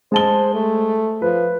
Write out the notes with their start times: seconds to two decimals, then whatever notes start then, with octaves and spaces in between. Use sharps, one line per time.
0.12 G#3 C5 A5 G7
0.54 A3
1.22 F3 B4